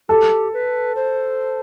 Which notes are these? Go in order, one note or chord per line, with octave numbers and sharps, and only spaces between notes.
G4 A4
B4
C5